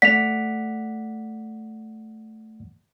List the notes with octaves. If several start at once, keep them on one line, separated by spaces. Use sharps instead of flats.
A3 D5 F#5 B6 F7